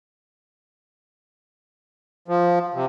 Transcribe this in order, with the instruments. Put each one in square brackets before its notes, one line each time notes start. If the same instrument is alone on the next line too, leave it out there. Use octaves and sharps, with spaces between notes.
[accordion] F3
C3